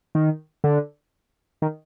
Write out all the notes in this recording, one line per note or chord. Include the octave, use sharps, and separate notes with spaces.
D#3
D3
D#3